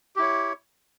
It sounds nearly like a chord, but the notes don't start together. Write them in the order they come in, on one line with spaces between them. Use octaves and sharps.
G4 E4 C#5